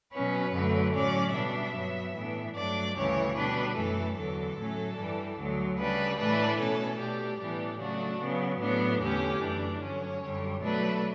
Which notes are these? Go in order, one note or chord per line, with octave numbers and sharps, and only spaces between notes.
B2 F#3 C#4 B4
F#2 D3 F#3 A3
A2 F#3 C#4 D5
B2 G3 D4 E5
G2 F#3 B3
A2 E3 B3 D4
G2 F#3 A3 D4 D5
D2 C#3 E3 G3 C#5
B2 G3 D4 B4
F#2 E3 A3 A4
E2 D3 F#3 A4
A2 F#3 A3 C#4
G2 E3 G3 D4
D2 D3 F#3
C#3 G3 D4 B4
A2 E3 A3 D4 B4
B2 A3 C#4 A4
B2 A3 D4 G4
A2 E3 G3 B3 D4 G4
C#3 F#3 A3 D4 F#4
C#3 F#3 B3
A2 F#3 B3 D4
E2 D3 A3 C#4 G4
F#2 E3 A3 D4
G2 D3 F#3 C#4 C#5
F#2 D3 G3
B2 F#3 A3 D4 B4